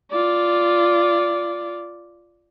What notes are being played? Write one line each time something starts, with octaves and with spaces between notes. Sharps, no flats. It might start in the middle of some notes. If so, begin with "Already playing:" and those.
F4 D5